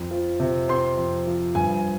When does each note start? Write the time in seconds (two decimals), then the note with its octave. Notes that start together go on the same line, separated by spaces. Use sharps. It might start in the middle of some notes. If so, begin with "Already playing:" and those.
Already playing: F2
0.11 F3
0.40 C3
0.68 C4 C6
0.97 F2
1.27 F3
1.55 G2 G#5